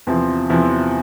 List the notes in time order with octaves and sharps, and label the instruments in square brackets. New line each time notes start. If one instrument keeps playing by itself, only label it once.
[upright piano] E2 C3 F3 C4 E4
E2 C3 F3 C4 E4